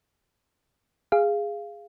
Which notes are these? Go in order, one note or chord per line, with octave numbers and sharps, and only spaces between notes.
G#4 F5